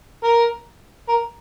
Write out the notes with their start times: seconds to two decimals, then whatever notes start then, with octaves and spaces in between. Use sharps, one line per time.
0.24 A#4
1.09 A#4